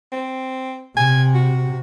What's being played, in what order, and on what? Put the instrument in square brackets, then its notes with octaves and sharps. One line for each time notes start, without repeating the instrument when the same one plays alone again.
[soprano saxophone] C4
[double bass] C3 [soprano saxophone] G#5
[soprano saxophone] F#4